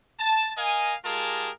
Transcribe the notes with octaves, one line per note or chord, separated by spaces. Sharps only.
A5
A#4 D#5 F5 G#5
G#3 F4 G4 G#4 A#4 A5